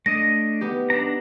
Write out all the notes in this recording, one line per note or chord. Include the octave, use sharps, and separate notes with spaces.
A3 D4 D#5 A#6
B3 D#4 G4
B3 D4 A#5